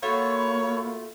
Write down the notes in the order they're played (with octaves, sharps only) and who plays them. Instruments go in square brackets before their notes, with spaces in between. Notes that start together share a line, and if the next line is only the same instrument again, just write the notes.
[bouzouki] A3 F4 F#4 [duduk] A#3 [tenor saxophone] C#5 [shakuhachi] B5